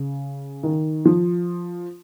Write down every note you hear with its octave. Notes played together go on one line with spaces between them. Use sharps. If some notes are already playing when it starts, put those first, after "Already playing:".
Already playing: C#3
D#3
F3